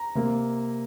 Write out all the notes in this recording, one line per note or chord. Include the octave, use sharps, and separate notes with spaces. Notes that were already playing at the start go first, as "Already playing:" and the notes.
Already playing: A#5
C3 A#3